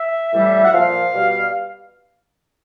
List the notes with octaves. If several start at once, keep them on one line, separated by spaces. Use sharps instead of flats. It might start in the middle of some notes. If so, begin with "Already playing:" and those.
Already playing: E5
A2 E3 G3
F#5
A#2 F3 F5
B2 G3